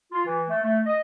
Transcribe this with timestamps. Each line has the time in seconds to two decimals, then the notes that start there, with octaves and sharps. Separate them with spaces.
0.12 F4
0.25 E3
0.49 A3
0.63 A3
0.85 D#5